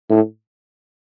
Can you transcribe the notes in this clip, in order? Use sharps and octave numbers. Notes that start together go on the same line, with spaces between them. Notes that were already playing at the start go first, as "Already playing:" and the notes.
A2